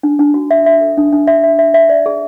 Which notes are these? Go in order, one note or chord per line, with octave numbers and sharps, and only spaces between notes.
D4
D4
F#4
E5
E5
A4
D4
D4
E5
E5
E5
E5
D5
G#4